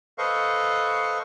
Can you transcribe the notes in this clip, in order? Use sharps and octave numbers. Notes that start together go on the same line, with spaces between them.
A4 B4 C5 D#5 F5 C#6